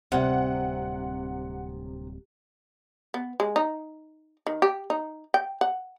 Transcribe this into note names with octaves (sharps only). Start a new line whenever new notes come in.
D1 C3 G3 C4 C5 D5 E5 F#5
B3
G#3
D#4
D#3
G4
D#4
G5
F#5